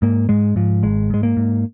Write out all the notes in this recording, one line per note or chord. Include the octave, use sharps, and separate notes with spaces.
G#2 A#3
G#2 G#3
G#2 F3
G#1 G#3
G#2 G#3
A#3
G#2